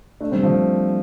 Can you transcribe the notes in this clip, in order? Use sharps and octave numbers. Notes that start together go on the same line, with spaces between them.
A3 D4
G3 C4
F3 A3